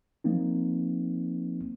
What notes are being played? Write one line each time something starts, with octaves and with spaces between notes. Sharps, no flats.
F3 A#3 C4 D#4